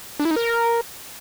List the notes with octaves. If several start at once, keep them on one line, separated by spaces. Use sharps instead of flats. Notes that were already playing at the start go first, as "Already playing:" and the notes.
D4
E4
D#4
A#4